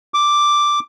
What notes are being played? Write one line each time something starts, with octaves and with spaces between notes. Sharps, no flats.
D6